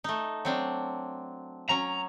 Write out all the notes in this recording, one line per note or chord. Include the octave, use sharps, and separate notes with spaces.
A3 D#4
F#3 C4 D4
F#3 C#4 A#5